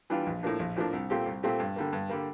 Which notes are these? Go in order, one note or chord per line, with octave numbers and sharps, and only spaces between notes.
E3 G3 D4 F4
A#1
A2 F3 A#3 D4
A#1
A2 F3 A#3 D4
C2
A#2 A3 C4 G4
C2
A#2 A3 C4 G4
G2
D3 G3 A#3
G2
D3 G3 A#3